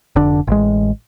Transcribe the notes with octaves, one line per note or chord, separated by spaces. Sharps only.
F1 D3 D4
A1 G#3